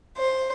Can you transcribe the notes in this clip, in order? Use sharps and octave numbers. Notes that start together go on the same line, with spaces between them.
C5